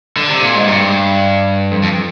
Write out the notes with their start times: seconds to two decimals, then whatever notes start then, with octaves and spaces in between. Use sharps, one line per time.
0.17 D3
0.29 C3
0.42 A#2
0.55 G#2
0.67 G2
1.71 F2
1.83 F2